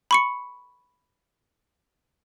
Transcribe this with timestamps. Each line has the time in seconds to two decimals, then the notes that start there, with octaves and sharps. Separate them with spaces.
0.11 B5 C#6 C#7